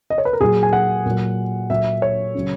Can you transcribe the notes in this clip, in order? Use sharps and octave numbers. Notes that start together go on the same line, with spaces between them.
D#5
C#5
B4
A#4
A#2 F#3 G#4
G#5
F#5
A#2 F#3
A#2 F#3 E5
C#5
C#3 F#3